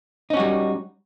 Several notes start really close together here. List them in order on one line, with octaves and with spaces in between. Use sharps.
D#4 C#4 F#4 G3